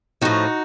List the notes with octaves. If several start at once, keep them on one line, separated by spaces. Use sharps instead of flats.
A2 F3 D#4 F#4